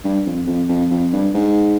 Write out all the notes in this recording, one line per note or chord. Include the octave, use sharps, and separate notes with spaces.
G2
F2
F2
F2
F2
G2
G#2